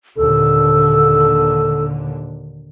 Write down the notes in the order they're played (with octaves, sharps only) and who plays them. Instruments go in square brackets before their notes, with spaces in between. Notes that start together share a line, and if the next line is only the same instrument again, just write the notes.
[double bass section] D#2 A#2 D3 [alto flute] A4